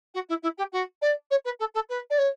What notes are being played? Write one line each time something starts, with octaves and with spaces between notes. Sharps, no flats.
F#4
E4
E4
G4
F#4
D5
C#5
B4
A4
A4
B4
D5
C#5